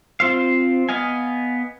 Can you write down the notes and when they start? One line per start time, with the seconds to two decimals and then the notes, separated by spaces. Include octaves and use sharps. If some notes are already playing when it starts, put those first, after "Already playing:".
0.20 C4 F4 C5 F5
0.89 B3 D#5 F5 G#5